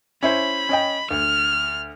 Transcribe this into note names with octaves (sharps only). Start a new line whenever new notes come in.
C#4 E4 C5 B5
C#4 D#5 G5
D2 F6